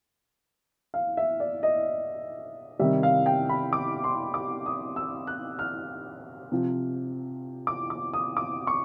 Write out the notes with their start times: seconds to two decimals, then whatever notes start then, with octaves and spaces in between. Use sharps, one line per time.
0.94 F5
1.17 E5
1.40 D5
1.63 D#5
2.79 C3 D#3 G3 E5
3.03 F5
3.26 G5
3.49 B5
3.73 D6
4.04 C6
4.34 D6
4.66 D#6
4.96 E6
5.27 F#6
5.59 F6
6.52 C3 F3
7.67 D6
7.90 D6
8.13 D#6
8.37 D6
8.67 C#6